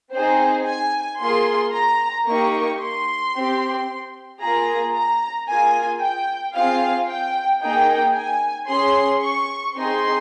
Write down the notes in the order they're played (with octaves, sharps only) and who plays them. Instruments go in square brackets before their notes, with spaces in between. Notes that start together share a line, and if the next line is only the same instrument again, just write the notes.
[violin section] C4 D#4 G#4 C5
G#5
A#3 F4 G#4 C6
A#5
A#3 D#4 G4 C#6
C6
C4 G4
A#3 F4 G#4 A#5
A#5
A#3 F4 G#4 G#5
G5
C4 F4 G#4 F5
G5
A#3 D#4 G#4 G5
G#5
C#4 G#4 C6
C#6
C4 D#4 G#4 C6